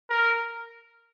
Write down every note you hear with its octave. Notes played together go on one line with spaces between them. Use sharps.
A#4